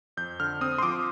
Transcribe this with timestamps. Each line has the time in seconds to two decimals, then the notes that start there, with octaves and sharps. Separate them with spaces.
0.17 F2 G6
0.40 D3 F6
0.61 C4 D#6
0.78 C6
0.83 F3 D6